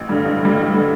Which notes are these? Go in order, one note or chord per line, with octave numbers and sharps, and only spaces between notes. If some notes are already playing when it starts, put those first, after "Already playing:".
Already playing: A1
G2 D3 G3
A1
G2 D3 G3
A1
D3 G3